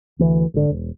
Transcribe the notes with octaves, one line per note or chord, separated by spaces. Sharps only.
D2 E3
G#1 D3
E1